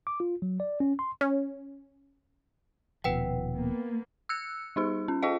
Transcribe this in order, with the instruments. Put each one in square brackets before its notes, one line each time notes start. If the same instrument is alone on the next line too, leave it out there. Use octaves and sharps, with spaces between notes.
[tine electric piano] D6
F4
F#3
D5
C#4
C6
[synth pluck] C#4
[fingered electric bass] D#1 B2 F3 [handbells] B4 F#5 G5
[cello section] A#3 B3
[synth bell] E6 F#6 C#7
G3 D#4 G#4
C#4
F4 G#4 D#5 F5